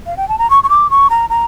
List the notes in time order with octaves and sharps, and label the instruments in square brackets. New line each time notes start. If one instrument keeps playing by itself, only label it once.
[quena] F5
G5
A5
A#5
C#6
C#6
D6
C#6
A#5
A#5